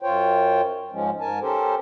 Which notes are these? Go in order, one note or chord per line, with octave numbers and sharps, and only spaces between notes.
F#2 F4 C5 C#5 G5
G#2 F3 G#3 C#4
G#2 A#4 G#5 A5
C#4 G4 A4 A#4 C5